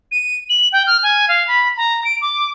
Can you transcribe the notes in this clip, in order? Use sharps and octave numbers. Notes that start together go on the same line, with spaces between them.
D#7
F#7
G5
F6
G#5
F5
B5
A#5
D7
D6